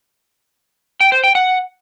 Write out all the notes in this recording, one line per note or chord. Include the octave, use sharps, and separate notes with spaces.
G5
C5
G5
F#5